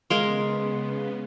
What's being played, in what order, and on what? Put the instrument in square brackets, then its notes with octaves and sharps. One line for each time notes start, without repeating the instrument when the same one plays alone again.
[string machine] C#3 B3 [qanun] G#3 A#4 [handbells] F5 C6